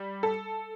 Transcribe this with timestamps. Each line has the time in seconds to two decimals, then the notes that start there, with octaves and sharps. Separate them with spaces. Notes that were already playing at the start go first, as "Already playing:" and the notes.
Already playing: G3
0.23 A4